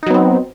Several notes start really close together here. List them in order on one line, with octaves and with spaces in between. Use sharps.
D#4 F#3 B3 C4